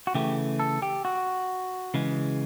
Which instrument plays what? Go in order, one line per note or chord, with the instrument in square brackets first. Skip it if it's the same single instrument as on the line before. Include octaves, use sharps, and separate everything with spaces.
[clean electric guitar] F#4
C#3 E3 A3 G4
A4
G4
F#4
C#3 E3 G#3